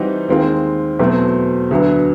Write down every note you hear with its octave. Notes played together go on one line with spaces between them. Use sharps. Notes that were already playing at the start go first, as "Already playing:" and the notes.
Already playing: E3 G3 C4 D#4 F#4
D#2 D#3 G#3 C4 F4
E2 B2 F#3 A3 C4
D2 D3 F#3 B3